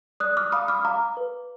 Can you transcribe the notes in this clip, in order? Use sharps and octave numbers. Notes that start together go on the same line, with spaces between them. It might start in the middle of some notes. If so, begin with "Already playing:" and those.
D5 D#6 F#6
D6 F6
F5 B5 D#6
D6 F6
F5 A#5 D6
B4